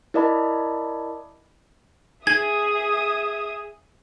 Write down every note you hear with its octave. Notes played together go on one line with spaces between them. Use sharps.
E4 A#4 D5 D#5 A5 B5
G#4 E5 D#6 G#6